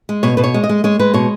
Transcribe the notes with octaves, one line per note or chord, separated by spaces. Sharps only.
G#3
B2 C#5
B2 B4
C#5
G#3
D#5
G#3
G#3 C#5
G#3 B4
B2 C#5